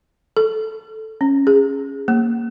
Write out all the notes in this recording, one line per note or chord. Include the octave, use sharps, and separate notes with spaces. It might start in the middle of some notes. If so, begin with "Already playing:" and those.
A4
C#4
G#4
A#3